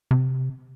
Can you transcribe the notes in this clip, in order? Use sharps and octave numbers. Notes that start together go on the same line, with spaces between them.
C3